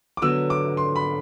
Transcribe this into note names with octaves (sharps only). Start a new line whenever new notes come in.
D6
D3 F#3 B3 E6
D6
C6
B5